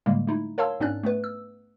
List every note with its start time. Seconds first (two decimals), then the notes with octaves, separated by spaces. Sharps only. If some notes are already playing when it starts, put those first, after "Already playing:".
0.06 A2 D3 G3 G#3 A#3
0.27 A3 D#4 E4
0.58 A#4 C#5 F5 A5 C6 E6
0.80 G#2 B3 C#4 D4 D5 F#6
1.03 A3 B3 B4
1.24 E6